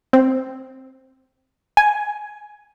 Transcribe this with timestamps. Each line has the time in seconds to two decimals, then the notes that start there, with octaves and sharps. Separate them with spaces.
0.13 C4
1.77 G#5